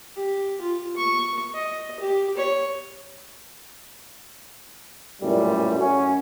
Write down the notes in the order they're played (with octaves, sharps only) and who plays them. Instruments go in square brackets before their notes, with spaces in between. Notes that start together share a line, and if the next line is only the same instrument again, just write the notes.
[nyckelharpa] G4
F4
C#6
D#5
G4
C#5
[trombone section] A1 F#2 A#2 G3 A3
F#2 F#3 C#4